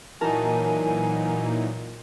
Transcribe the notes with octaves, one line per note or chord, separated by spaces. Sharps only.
A#2 E3 F#3 D#4 A#4 G#5 A5